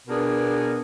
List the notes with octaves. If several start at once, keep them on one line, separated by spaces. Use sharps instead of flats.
B2 B3 D4 G#4 A#4